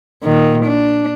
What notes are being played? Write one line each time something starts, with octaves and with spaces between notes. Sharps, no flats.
A#2 D#3
D4